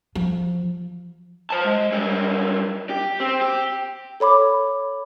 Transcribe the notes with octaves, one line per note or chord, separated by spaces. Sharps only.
F3
C5 A5
G#3
F#2 G3
G4
C4
G4
A4 C#5 B5 D6